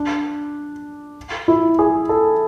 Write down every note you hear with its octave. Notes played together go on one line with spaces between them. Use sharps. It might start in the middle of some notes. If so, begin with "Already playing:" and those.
Already playing: D4
E4
G#4
A4